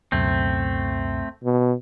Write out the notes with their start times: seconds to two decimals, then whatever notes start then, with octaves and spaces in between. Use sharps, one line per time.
0.12 C#2 F#2 B2 A3 C4
1.44 B2